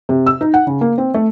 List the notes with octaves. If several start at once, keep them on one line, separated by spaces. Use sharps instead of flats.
C3
E6
D#4
F#5
C#3
A#3
C4
A3